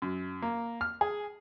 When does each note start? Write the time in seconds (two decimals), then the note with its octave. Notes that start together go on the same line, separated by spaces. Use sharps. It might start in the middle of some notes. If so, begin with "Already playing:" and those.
0.02 F#2
0.42 A#3
0.81 F6
1.01 G#4